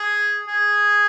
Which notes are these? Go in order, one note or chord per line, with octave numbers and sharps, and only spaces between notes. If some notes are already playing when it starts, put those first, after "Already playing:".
Already playing: G#4
G#4